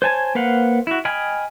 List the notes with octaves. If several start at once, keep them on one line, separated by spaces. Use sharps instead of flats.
C5 C#5 G#5 A5
A#3 B4 C5 F5 F#5
E4 F#4
D#5 G5 G#5 B5 F6